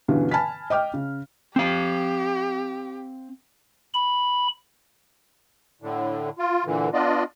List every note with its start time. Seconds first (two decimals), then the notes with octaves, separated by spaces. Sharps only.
0.08 G2 B2 D3 E3 C#4
0.31 G#5 A5 B5 F6 B6
0.70 D#5 G5 D6 F6
0.94 C#3
1.56 C4 G4 F5
3.94 B5
5.82 A2 D3
6.39 F4
6.65 A#2 D3 E3
6.93 B3 D4 F4 D5 D#5